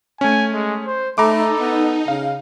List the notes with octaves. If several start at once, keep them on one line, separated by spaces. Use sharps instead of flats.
A3 C#4 G#5
G#3
C5
A3 D#4 A4 A#5 B5 D6
B3
C#3 F5